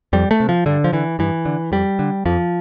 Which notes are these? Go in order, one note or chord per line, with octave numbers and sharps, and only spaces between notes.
F2 G3
A3
C3
F3
G2 D3
F3
D3 E3
G2 E3
D3
F2 G3
D3
F2 F3